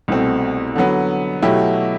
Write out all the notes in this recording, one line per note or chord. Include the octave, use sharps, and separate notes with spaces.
C2 B2 A3 C4
D3 F#3 B3
B2 F#3 A3 E4 G4